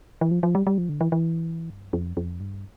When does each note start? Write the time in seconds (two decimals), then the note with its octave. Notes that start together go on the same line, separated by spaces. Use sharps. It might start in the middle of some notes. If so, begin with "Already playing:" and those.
0.21 E3
0.31 F3
0.43 F3
0.55 G3
0.67 G3
0.78 F3
0.89 D3
1.01 E3
1.12 E3
1.70 G2
1.93 F2
2.17 F2
2.40 G2